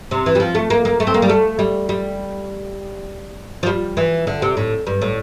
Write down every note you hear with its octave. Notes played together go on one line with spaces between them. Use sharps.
C3
E3
G3
F3
A3
A#3
A#3
A3
C4
A#3
G3
A3
G3
G3
F3
G3
E3
D3
C3
A2
G2
A2